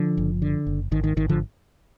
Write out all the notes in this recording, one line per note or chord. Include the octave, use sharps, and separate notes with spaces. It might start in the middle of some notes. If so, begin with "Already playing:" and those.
Already playing: D3 F3
F#1
D3
F#1
G#1 D#3
D#3
G#1 D#3
D3 F3